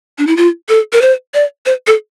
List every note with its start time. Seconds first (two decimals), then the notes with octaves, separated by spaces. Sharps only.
0.18 D4
0.27 E4
0.37 F4
0.69 A4
0.93 A#4
1.02 C5
1.34 D5
1.66 C5
1.87 A4